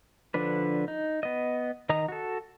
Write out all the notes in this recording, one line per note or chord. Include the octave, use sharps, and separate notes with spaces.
D3 F3 D4 B4
D#4
B3 D#5
D#3 D#5 A#5 D#6
F#4 A4